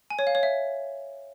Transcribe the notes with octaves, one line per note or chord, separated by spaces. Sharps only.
G#5
C#5
F5
C#5
E5